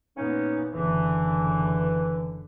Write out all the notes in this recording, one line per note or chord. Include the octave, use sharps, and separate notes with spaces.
A#2 B3 C#4 D#4
F#1 D3 E3